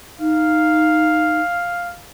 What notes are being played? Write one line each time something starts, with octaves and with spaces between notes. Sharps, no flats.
D#4 F5